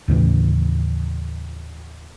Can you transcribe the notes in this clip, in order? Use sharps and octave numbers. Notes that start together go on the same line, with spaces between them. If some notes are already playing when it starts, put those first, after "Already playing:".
D#2 A2 C#3 E3